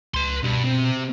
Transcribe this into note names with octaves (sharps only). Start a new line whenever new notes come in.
C#2 B4 C6
G2 B2
C3